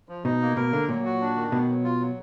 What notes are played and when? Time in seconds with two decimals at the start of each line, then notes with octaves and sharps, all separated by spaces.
0.09 F3
0.24 B2 D#4
0.41 A#3
0.56 B2 A#4
0.72 D3 A#3
0.88 A#2 F#3
1.05 F#4
1.21 D4
1.36 D#3
1.52 B2 B3
1.69 F#3
1.84 F4
2.00 F#3